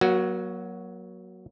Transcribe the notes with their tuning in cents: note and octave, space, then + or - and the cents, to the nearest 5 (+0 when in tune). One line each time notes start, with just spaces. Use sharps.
F#3 +0 A#3 +35 F#4 +0